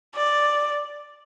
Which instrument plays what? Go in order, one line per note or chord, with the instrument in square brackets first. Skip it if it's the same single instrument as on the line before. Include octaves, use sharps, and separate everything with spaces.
[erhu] D5